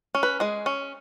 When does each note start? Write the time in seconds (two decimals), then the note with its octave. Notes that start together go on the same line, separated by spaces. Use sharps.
0.15 C#4
0.23 B4
0.40 G#3 G#4
0.66 C#4